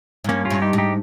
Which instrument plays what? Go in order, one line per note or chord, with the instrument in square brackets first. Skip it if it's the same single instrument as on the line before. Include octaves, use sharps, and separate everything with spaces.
[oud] G#2
[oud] G2 [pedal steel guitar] A#3 C#4
[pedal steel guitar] C#4 F4
[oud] G2
[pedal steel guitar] D#4 G4
[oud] G#2
[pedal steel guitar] D#4 G4